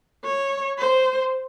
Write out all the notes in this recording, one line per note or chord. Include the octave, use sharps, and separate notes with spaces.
C#5
C5